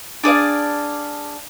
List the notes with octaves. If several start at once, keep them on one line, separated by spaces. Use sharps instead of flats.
D4 G#4 D5 F5